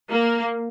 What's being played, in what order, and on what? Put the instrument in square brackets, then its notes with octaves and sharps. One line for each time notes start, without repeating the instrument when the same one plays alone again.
[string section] A#3